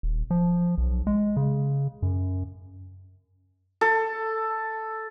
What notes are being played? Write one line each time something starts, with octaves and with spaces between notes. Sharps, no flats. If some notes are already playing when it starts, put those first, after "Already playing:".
D#1
F3
B1
G#3
C#3
F#2
A4